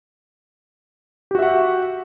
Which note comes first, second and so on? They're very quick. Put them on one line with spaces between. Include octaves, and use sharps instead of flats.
G4 F#4 E5 F#5